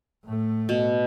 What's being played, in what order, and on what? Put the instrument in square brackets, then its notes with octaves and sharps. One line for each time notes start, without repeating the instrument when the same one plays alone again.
[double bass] A2 A3
[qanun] B2